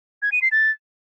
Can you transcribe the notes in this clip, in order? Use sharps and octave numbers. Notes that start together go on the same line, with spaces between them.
G#6
D#7
C7
A6